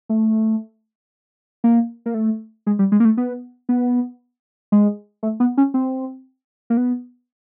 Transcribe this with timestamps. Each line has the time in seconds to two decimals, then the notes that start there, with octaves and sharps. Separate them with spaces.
0.09 A3
1.64 A#3
2.06 A#3
2.14 A3
2.67 G#3
2.79 G3
2.92 G#3
3.00 A#3
3.05 A3
3.17 B3
3.69 B3
4.72 G#3
5.23 A3
5.40 B3
5.58 C#4
5.74 C4
6.70 A#3
6.77 B3